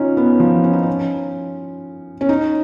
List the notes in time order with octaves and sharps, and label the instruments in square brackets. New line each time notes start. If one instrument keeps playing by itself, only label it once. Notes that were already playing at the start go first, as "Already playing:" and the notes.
Already playing: [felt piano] C#4 D#4 F4
B3
F3
C#4
D#4
C#4
C#4
D#4